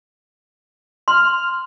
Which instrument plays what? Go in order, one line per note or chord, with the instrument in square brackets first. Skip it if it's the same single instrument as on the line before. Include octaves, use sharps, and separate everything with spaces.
[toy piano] C6 [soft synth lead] F6